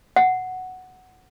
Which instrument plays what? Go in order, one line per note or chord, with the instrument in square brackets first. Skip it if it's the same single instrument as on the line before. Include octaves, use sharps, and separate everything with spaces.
[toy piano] F#5